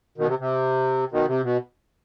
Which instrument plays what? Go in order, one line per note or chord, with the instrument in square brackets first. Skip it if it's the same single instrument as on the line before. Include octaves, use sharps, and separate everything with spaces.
[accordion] B2 D#3
C3
C3
B2 D#3
C3
B2